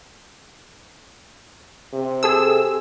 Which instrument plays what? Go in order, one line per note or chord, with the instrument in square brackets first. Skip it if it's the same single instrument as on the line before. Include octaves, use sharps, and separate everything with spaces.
[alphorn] C3
[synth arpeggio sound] G#4 A4 E6